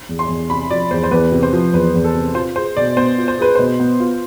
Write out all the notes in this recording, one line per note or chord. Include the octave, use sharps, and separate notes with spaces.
E2
C6
E2
C3 B5
F3 D5
E2 C5
C5
E2 B4
C3
C5
F3
E2 B4
E2
A4
C3
F4 C5
G#4 C5
B2 D5
B3 C5
F4
C5
G#4 B4
B2 C5
B3
F4